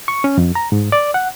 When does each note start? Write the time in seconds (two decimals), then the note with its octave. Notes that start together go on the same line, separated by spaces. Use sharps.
0.08 C#6
0.24 C#4
0.38 F2
0.55 A#5
0.72 G#2
0.92 D5
1.14 F#5